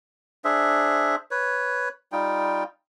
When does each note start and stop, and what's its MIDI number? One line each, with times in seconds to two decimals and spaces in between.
0.44 1.16 62
0.44 1.16 68
0.44 1.16 72
0.44 1.16 76
1.31 1.89 71
1.31 1.89 73
2.12 2.64 55
2.12 2.64 63
2.12 2.64 65
2.12 2.64 79